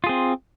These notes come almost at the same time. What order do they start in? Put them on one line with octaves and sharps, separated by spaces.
F4 G#4 C4